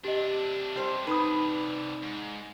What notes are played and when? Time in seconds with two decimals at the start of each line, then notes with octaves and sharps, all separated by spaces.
0.04 C3 D4 G4 D#5
0.76 G3 C5
1.07 D#4 B4 B5 D#6
2.03 G#2